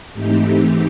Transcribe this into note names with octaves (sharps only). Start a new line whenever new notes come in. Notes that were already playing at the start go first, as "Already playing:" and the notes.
G#2 E3 A3 C4 D#4 G4